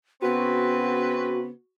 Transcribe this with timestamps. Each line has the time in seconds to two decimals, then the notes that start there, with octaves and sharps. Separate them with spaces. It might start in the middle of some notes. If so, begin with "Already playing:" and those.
0.22 C#3 B3 C4 F#4 B4